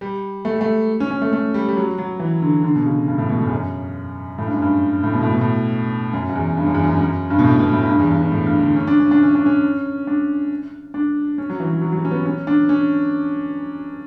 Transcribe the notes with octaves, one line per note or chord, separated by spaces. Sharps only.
G3
A3
G3
A3
C#4
C#4
A3
A3
G3
G3
F#3
F#3
E3
D3
D3
B2
C#3
G2
A2
B2
A2
E2
F#2
A2
G2
F#2
G2
A2
B2
A2
B2
A2
F#2
F#2
E2
G2
F#2
E2
F#2
F#2
G2
B2
A2
B2
A2
G2
E2
G2
G2
A2
G2
D3
C#4
D4
C#4
D4
C#4
D4
C#4
D4
D4
C#4
F#3
E3
F#3
F#3
F#3
G3
C#4
B3
C#4
D4
C#4